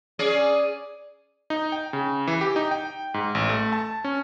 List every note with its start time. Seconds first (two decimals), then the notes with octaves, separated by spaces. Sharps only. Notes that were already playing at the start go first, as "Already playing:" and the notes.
0.19 C#4 G#4 D5
1.50 D#4
1.72 G5
1.93 C#3
2.28 E3
2.41 G4
2.56 D#4
2.71 G5
3.14 G#2
3.35 A1
3.49 A3
3.73 A5
4.04 C#4